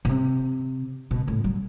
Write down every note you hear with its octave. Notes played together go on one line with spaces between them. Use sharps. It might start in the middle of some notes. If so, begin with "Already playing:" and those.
B2
C3
B2
A2
F#3